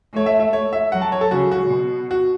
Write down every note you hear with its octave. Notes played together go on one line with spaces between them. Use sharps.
A3 C#5
E5
E5
C#5
E5
F#3 F#5
A5
C#5
A4
C#3 F#4
F#4
B2
F#4